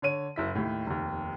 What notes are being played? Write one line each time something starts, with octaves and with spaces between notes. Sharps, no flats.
D3 C#5 D#7
F#1 E4 B6
D#2 A2
F1 D#2